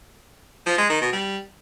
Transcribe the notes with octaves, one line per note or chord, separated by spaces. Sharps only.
F3
G#3
D#3
B2
G3